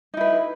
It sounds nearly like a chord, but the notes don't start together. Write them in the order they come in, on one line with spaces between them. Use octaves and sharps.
D#4 E4 B4